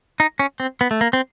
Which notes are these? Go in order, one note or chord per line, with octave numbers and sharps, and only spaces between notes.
D#4
C#4
C4
B3
A3
A#3
C4